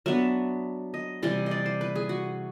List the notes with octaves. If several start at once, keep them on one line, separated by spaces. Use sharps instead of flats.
F#3 B3 D4 E5
D#5
C3 E3 G3
D#5
D5
C5
B4
G#4
F#4